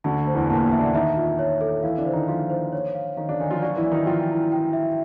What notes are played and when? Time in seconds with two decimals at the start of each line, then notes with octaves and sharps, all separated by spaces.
0.04 D2 D3 A5
0.27 C5
0.34 E2 E3
0.49 A#2 A#3 A5
0.72 E5
0.79 D3 D4
0.94 D#3 D#4 E5
1.17 F4
1.39 C#5
1.61 A4
1.83 E3 E4 F5
1.98 D3 D4
2.06 C5
2.13 D#3 D#4
2.27 F3 F4 F5
2.50 C5
2.72 C#5
2.94 F5
3.17 D#3 D#4 F5
3.28 D3 D4
3.40 D#3 D#4 G#5
3.51 F3 F4
3.62 F#3 F#4 D5
3.76 E3 E4
3.84 D5
3.92 D#3 D#4
4.06 F3 F4 G5
4.29 E4
4.52 G5
4.73 E5